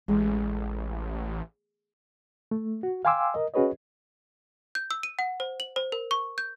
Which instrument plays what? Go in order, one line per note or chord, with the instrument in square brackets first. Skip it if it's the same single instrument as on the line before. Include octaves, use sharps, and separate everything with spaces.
[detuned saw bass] A1 [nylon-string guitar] G#3
[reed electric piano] A3
F#4
F5 G5 G#5 C6 D6 E6
A#4 D#5
C#4 F#4 G#4 B4 C#5 D#5
[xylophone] G6
E6
D#7
F#5
C5
F#7
C5
A#4
C#6
G6